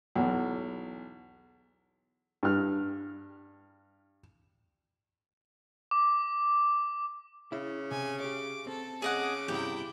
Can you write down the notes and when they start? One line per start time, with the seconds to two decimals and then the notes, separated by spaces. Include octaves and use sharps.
0.15 B1 E2
2.43 G2 F6
5.91 D6
7.52 C#3 E4 E5
7.91 C3 G#5
8.20 G4 C#5 D6
8.67 C4 A4
9.02 C#3 G#4 D#5 F#5 G#5 D6
9.48 E2 G2 C3 E4 G4 G5